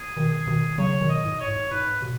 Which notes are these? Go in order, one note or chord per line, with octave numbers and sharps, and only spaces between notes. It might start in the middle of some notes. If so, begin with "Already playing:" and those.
Already playing: G#4
B2 D#3
G#4
B2 D#3
C#3 F#3 C#5
B2 D#3
D#5
G#2
C#5
G#2
G#2 B4
B2